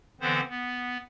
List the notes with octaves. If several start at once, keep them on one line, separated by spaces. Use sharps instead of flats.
D3 E3 B3 C4 C5
B3